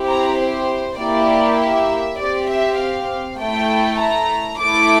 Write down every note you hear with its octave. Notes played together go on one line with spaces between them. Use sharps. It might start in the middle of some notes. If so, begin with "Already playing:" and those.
Already playing: C4 E4 G4
A#5
C5
A#3 E4 G4 D5
E5
C4 G4 D5
E5
F5
A3 E4 A4 G5
A#5
A3 E4 A4 D6